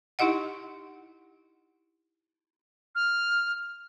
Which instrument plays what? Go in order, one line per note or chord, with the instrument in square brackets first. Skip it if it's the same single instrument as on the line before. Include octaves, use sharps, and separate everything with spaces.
[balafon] D#4 E4 G4 D#5 F#5
[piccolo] F6